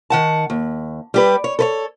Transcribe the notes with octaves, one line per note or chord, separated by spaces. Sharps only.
D#3 F#5 A5
D#2
G3 G4 B4
C#5
A4 B4 C#5